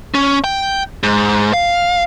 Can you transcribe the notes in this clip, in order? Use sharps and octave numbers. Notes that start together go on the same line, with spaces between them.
C#4
G5
G#2
F5